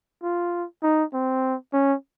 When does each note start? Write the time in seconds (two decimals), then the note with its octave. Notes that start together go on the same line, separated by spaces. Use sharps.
0.23 F4
0.83 D#4
1.13 C4
1.73 C#4